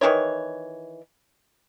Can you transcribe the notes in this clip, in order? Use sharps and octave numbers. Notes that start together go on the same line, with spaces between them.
D#3 E3 E4 C#5